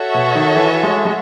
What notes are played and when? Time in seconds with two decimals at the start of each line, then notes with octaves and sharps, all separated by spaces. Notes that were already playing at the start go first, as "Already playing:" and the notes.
Already playing: F#4 A4 C#5 E5
0.14 B2
0.35 D#3
0.55 E3
0.83 G#3
1.05 G#3